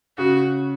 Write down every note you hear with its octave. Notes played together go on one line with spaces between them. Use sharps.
C#3 F#4